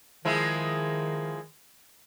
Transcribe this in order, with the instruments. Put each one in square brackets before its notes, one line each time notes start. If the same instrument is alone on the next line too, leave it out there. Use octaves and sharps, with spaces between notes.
[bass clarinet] D#3 [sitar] F3 G#3 E4